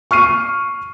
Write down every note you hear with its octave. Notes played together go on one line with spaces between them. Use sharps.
C#6 F6 C7 D#7